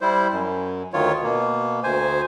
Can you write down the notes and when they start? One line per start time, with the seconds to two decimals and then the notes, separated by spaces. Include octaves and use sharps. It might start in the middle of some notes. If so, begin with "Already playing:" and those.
0.01 G3 E4 C5
0.32 F#2
0.94 D2 D#3 F4 C#5
1.23 B2 A#3
1.84 D2 C5 G#5